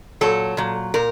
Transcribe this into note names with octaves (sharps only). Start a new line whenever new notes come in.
A#2 F#3 A4
A#2 F#3
A#2 A#4